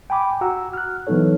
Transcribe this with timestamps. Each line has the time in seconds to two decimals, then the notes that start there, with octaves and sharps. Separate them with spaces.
0.10 G5 G#5 B5 D6
0.41 F#4 F#5 A#5 E6
0.74 F6 F#6
1.07 E3 F#3 B3 D#4 A4 C#5